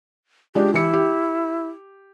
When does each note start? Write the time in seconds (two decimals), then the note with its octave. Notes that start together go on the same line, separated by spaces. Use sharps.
0.55 G#3 D4 F4 G4
0.74 E3 E4 G4 C#7
0.93 G4